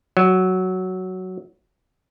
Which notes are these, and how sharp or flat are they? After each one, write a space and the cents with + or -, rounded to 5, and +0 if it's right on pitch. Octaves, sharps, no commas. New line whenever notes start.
F#3 +5